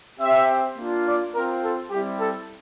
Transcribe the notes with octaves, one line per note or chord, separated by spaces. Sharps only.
C4 G4 E5
A#3 D4 F4
D5
C4 F4 A#4
A4
G3 C4 E4 G4
A4